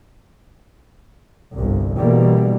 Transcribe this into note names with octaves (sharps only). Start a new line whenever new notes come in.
G1 C2
B2 D3 E3 G3 A#3